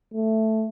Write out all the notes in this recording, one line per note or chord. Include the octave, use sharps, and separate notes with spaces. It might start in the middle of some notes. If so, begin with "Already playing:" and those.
A3